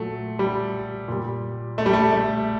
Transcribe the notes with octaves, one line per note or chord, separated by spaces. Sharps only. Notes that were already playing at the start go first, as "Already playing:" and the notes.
Already playing: A#2 F#3 A3
G3
A#2 G3
A3
G3
A3
A3